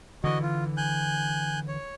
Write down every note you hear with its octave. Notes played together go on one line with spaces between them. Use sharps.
D3 E3 F#4 D#5
F4
G#5 F#6 G6
C#5